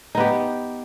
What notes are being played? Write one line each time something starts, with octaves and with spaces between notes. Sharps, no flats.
B3 D#4 G4